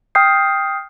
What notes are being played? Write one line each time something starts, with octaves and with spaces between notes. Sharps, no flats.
G5 D#6 F6 G6 C7